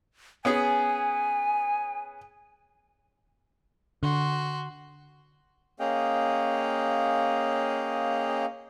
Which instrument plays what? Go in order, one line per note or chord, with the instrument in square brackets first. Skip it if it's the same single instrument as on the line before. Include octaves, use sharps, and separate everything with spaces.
[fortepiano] B3 C#4 G#4 [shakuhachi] G#5
[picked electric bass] D3 [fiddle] F#4 C6
[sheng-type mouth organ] A#3 C#4 G#4 D#5 F5 G5